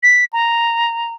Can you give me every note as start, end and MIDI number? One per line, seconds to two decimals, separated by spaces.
0.03 0.25 95
0.33 1.14 82